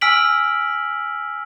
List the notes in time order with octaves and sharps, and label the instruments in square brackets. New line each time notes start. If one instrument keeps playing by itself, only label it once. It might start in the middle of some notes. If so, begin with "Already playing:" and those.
[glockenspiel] G#5 E6 F6 B6 D7 F#7